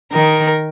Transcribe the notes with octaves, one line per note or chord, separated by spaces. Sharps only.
D#3 A#4